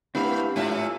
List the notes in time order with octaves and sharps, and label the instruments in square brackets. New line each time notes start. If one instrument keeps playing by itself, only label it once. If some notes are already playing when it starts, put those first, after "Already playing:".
[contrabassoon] G2 [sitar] A3 [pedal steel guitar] C4 E4 F5 [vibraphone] B4 F#5 B5
[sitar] G#2 A3 E5 [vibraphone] F4 [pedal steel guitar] G#5